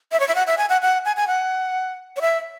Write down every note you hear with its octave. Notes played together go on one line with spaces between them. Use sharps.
E5
C#5
E5
F#5
E5
G#5
F#5
F#5
G#5
G#5
F#5
C#5
E5